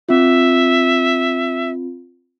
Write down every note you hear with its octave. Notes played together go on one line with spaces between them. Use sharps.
C4 F4 E5